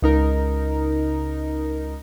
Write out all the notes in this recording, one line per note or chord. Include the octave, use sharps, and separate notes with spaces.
C#2 D#4 A#4